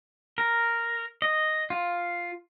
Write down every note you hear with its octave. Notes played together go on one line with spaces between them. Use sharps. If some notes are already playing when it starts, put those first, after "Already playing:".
A#4
D#5
F4